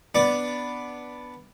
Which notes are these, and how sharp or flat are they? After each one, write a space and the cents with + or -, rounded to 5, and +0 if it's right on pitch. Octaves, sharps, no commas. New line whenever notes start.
B3 +0 D4 +0 D5 +0